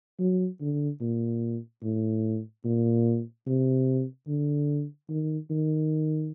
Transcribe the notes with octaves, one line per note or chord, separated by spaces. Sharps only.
F#3
D3
A#2
A2
A#2
C3
D3
D#3
D#3